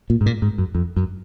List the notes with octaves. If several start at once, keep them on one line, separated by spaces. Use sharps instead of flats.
A#2
G#2
A#2
G#2
F#2
F2
F#2